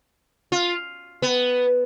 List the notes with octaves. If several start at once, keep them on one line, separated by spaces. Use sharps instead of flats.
F4
B3